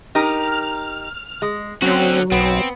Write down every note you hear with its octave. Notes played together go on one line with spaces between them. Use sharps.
D#4 G4 A#4 F6
G#3
D3 F#3 C4 C#4 F#4
B1 B3 C4